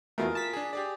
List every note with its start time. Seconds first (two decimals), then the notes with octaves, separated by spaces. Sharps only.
0.18 E2 B2 A3 F4 G#4 A#4
0.35 A5 B6
0.53 D4 G#4
0.73 G4 G#4 D5